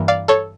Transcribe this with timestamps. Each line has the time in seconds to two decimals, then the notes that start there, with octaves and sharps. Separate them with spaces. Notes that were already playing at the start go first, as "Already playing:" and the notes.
Already playing: G2 E3 A#3
0.08 D5 F5
0.28 A4 C#5